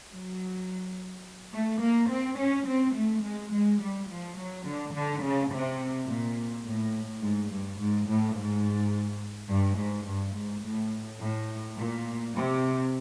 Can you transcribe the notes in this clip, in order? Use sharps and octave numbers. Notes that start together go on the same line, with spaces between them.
F#3
A3
A#3
C4
C#4
C4
A3
G#3
G#3
G3
F3
F#3
D3
D3
C#3
C3
A#2
A2
G#2
G2
G#2
A2
G#2
G2
G#2
G2
G#2
A2
A2
A#2
C3